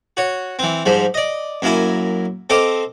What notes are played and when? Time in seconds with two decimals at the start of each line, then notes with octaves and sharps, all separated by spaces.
0.17 F#4 C#5
0.59 E3 C4
0.86 G#2 F3 G3
1.14 D5 D#5
1.62 F#2 A#3 E4 G#5
2.50 C4 A4 C5 D#5 F5 D6